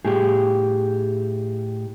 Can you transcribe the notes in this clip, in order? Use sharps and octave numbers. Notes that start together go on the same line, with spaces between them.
A2 G4 G#4